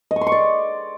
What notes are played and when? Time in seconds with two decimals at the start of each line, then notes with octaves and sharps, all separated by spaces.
0.11 D#5
0.16 C#6
0.21 C6
0.27 C#6
0.32 D5